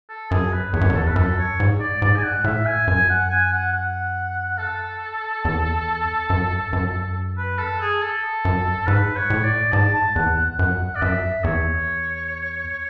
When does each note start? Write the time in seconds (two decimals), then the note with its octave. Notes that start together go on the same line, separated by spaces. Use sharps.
0.09 A4
0.31 F#2 G#4
0.53 B4
0.73 E2 C#5
0.81 F#2
0.89 E2
0.95 A4
1.07 B4
1.16 F#2 A4
1.38 C#5
1.60 G#2
1.80 D5
2.02 G#2 D5
2.16 G#5
2.23 F#5
2.44 A2 E5
2.66 G#5
2.87 F#2 G#5
3.10 F#5
3.30 G#5
3.53 F#5
3.73 F#5
4.58 A4
5.45 E2
6.30 F#2
6.73 F#2
7.37 B4
7.58 A4
7.81 G#4
8.02 A4
8.45 F#2
8.87 G#2 B4
9.16 C#5
9.30 A2
9.44 D5
9.73 G#2 A5
9.94 A5
10.16 E2 F#5
10.37 F#5
10.59 F#2 F#5
10.95 D5
11.02 F#2 E5
11.44 E2 C#5